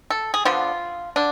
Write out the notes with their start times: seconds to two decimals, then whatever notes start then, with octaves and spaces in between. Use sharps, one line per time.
0.10 A4
0.34 G#4
0.45 D3 F3 B3 F4
1.16 D3 D4